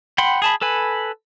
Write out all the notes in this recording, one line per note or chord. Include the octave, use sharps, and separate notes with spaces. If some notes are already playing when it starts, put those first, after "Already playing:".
F#5 G5 B5 C6
G#4 A5 B5
A4 B4 G#5 B5